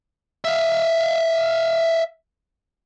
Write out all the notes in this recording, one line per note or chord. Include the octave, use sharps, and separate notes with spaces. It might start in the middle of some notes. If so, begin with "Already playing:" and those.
E5 F5